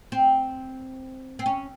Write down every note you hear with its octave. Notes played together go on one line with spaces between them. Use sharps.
C4
C4
C#4